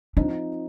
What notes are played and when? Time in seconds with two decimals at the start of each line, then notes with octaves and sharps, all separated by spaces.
0.17 F3 C4 D4 D#4